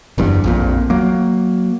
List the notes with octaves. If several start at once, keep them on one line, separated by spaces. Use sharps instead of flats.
F#1 E2 G2
A#1 F2 A#2
F#3 A#3